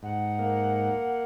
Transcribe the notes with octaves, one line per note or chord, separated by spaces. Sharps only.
G#2 F#5
A#3